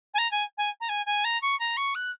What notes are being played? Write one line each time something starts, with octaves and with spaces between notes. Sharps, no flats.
G#5
A#5
G#5
G#5
A#5
G#5
G#5
A#5
C#6
A#5
C#6
F#6